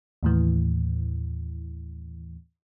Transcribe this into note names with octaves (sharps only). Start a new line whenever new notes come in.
D#2 A2 E3